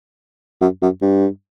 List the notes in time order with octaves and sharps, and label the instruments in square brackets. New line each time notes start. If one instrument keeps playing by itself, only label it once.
[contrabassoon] F#2
F#2
G2